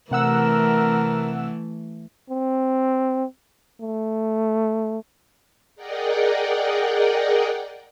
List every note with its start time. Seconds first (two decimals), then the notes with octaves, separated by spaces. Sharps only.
0.11 C3 E3 A3 A#4 F#5 E6
2.30 C4
3.81 A3
5.76 G#4 A#4 D5 D#5 F#5 G5